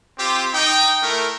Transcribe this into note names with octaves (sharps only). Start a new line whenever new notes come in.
C4 F4 G4
D#4 G5
A3 E4 A#4